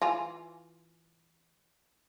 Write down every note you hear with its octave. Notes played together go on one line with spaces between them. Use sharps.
E3 F4 G#5